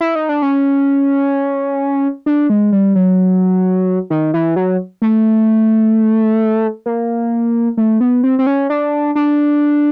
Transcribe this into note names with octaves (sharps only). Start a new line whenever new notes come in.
E4
D#4
D4
C#4
D4
G#3
G3
F#3
D#3
E3
F#3
A3
A#3
A3
B3
C4
C4
C#4
D4
D4